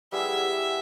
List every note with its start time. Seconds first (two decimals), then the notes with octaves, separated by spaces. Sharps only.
0.12 G3 B3 E4 G#4 E5